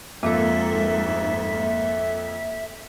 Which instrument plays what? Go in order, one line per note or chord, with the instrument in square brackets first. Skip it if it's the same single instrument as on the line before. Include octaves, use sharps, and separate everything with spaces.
[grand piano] F2 [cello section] G#2 [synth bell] A#3 A4 [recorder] E5